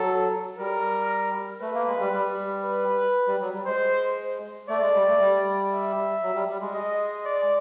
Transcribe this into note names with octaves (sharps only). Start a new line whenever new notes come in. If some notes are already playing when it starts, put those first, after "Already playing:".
Already playing: F#3 A4
G3 A#4
A3 B4
A#3
G#3
G3
G3
B4
G3
F#3
G3
G#3 C5
A3 D5
G#3
G3
A3
G3
E5
F#3
G3
G3
G#3
D#5
D5